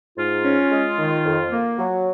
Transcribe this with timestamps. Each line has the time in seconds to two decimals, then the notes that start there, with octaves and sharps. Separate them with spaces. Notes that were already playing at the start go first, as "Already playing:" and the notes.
0.17 G#2 F4
0.43 C#4
0.71 G#3
0.98 D#3
1.25 F2
1.52 A#3
1.79 F#3